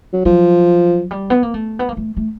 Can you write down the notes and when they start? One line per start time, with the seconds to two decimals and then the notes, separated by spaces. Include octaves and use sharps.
0.13 F#3
0.25 F3 F#3
1.11 G3
1.30 B3
1.43 A#3
1.54 A3
1.79 B3
1.89 A#3
1.97 A3
2.17 A3